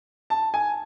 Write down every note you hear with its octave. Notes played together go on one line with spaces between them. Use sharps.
A5
G#5